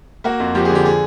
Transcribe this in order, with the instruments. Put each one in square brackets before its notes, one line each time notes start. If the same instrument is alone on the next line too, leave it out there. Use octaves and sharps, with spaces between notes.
[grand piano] A#3 F#4
F2
F3 G4
G#4
D3 G4
G#4